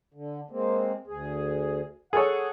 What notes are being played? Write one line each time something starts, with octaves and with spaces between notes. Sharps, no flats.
D3
G#3 A#3 C4
D2 G#4
G#4 A4 C#5 F#5